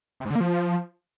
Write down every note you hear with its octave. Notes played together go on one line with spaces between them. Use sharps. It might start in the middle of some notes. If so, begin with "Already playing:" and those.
C3
G#2
D3
A#3
F3